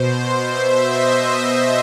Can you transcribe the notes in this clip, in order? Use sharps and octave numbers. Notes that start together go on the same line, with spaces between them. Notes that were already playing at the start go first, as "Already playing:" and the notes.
Already playing: B2 C5
C5
E5
D#5
C5